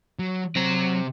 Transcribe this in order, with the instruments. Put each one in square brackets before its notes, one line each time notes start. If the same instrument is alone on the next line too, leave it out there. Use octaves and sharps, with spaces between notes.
[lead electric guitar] F#3
[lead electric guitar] C3 C4 [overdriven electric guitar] F#3 A#5